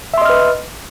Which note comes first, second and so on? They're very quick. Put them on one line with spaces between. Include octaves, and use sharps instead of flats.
E5 C6 D#5 F6 B4